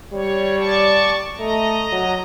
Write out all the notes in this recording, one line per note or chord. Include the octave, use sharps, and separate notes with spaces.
G3 C#5
D5 A5 C#6
A3 D#5 A#5
F#3